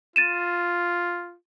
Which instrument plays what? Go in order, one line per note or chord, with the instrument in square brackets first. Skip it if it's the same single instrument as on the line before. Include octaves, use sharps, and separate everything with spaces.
[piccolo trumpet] F4 [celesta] A6 D#7 E7